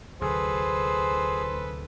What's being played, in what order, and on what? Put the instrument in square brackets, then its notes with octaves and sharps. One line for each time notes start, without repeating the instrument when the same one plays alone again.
[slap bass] D2 C3 F#3 [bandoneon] G#4 [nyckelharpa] A4 B4 [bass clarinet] C5